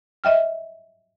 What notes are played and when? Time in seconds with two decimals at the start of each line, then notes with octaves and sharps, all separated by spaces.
0.24 D#5 E5 G5 F6